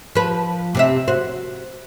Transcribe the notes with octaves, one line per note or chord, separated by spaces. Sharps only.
F3 B4
C3 C4 E5
F#4 C5